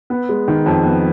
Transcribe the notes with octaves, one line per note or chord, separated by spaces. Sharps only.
B3
G#3
D#3
F2
B3